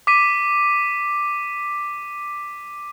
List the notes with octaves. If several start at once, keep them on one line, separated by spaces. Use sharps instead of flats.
D6 B6 D#7